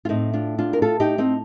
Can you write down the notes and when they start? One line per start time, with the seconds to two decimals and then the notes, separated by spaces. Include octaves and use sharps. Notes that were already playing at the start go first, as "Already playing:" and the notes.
0.05 F4
0.09 A2 C4 D#4
0.33 D4 F4
0.58 D4 F4
0.73 A#4
0.82 F4 A4
1.00 D#4 G4
1.18 C4 D#4